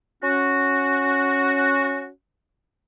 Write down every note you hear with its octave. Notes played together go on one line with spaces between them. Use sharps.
C#4 F#4